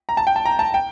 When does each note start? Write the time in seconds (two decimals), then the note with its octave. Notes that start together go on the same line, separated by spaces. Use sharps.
0.09 A#5
0.17 A5
0.27 G5
0.36 A5
0.45 A#5
0.59 A5
0.74 G5